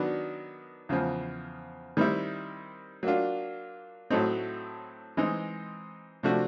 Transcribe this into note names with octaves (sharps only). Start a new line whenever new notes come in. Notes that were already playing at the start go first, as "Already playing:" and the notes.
Already playing: D#3 F#3 B3 D4
E2 C#3 F3
D#3 G3 C4 E4
F#3 A#3 D4 F4
A2 F#3 A3 C4 D#4
E3 G#3 C4 D#4
C3 F3 A3 D4 F#4